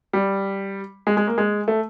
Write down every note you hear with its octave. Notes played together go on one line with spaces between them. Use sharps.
G3
G#3
G#3
A#3
G#3
A3